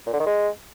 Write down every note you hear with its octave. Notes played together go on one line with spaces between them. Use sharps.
A#2
D3
D#3
G#3